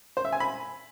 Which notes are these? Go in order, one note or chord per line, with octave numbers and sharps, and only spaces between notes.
C5
E5
G#5
B5